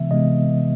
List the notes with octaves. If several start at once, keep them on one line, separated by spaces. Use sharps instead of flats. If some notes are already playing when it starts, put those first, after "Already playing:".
Already playing: C3 E3 G#3 B3 E5
C3 E3 G#3 B3 D#5